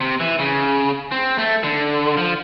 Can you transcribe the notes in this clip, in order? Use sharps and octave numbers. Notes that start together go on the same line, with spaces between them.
C3
E3
C#3
C4
A3
D3
F3